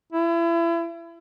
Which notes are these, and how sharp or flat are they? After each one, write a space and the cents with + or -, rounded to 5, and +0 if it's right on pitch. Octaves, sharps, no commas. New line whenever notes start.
E4 +35